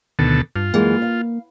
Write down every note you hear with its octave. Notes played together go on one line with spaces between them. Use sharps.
D2 B2 D#3 A4
G2 F4
F#2 E3 G#3 A#3
F5